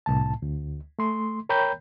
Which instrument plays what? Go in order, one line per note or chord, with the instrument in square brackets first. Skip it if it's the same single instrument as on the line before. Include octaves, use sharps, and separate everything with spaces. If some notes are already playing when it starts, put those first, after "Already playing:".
[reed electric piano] C2 A2 A5
D2
A3 C6
A#4 C#5 G5 A#5 B5 G6